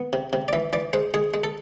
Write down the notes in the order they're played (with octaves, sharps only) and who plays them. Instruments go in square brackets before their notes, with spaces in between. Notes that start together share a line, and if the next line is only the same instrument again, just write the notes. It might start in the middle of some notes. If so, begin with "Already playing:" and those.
Already playing: [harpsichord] B3
C3
C3
D5
E3 E5
E3 D5
G#3 C5
G#3 G#4
G#3
A4